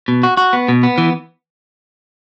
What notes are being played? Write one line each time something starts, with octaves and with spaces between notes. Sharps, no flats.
B2
F#4
F#4
B3
B2
B3
E3